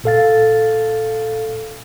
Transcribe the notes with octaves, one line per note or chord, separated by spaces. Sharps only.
A#2 A4 F5 A6